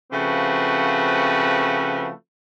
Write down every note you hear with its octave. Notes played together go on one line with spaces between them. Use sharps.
C#3 F3 A3 C4 F#4 B4